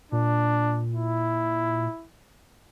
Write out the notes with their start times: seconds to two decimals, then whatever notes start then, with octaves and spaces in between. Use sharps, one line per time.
0.12 A#2 D4
0.94 E4